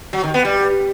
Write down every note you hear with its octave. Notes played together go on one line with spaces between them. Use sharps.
F#3
D#3
B3
G3